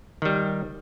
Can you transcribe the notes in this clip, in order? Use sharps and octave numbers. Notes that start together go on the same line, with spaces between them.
D#3 G3